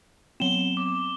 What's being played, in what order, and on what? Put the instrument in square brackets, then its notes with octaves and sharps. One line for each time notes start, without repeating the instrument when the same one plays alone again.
[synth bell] F#3 B3 C4 [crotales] E7 G7
[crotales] D6